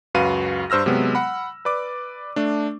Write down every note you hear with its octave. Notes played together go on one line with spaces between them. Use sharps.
C#2 F#2 F#4 B4 F5 D#7
G2 C5 E6 F6 A#6
C3 F#3 G#3 B3
F#5 B5
B4 D5 D6
A3 D4